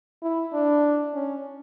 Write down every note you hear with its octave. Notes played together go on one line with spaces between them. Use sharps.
E4
D4
C#4